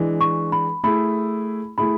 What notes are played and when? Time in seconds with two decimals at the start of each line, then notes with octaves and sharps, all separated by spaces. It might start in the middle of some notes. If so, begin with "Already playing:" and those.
Already playing: E3 G#3 D4
0.21 C#6
0.52 B5
0.83 A3 E4 G#4 B5
1.78 A3 E4 G#4 B5